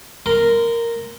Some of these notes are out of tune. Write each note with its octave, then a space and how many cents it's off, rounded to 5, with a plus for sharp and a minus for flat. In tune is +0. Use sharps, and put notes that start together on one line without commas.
A#4 -5 C6 -30